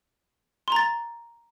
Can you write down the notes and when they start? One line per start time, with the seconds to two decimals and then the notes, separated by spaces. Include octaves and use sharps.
0.68 C6
0.72 A#5
0.76 A6